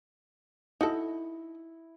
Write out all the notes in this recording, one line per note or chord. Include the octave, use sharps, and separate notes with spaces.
D#4 E4 F#4 A4